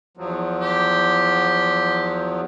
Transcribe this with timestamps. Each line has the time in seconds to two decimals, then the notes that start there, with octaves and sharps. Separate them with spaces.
0.17 E2 F3 F#3
0.62 G4